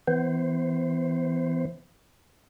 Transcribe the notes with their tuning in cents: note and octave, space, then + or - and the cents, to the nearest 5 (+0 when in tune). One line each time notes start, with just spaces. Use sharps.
E3 +0 B3 +30 C5 +0